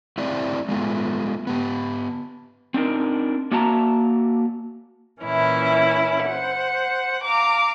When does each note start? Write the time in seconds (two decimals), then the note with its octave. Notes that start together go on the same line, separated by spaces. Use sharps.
0.18 A3 C4 E4 G4 D5
0.69 G#3 A3 B3 F4
1.47 B3 G4
2.74 C4 D4 D#4 A#4
3.51 A#3 F#4 D5 E5 A5 A#5
5.21 A#2 E3 C#4 E4
6.25 C5 F#5
7.23 F5 A#5 D6